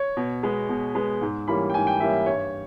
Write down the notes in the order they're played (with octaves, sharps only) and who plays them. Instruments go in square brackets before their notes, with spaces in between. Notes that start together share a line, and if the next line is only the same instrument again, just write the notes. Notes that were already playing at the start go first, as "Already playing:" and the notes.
Already playing: [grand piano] C#5
B2
G#3 B3
B2
G#3 B3
G#2
E3 G3 A#3 C#4 B5
G5
G#2 G#5
G5
E3 G3 A#3 C#4 E5
E5
G2 C#5